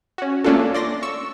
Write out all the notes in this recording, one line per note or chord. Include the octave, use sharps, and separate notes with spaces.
C#4 F#4
A3 A#3 C#4 D4 F4 A4
D5 C6 A#6
C#6 E6